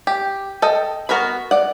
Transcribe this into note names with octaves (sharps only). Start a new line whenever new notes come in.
G4
A4 D#5 G5
B3 F#4 A#4 B4 B5
D5 F#5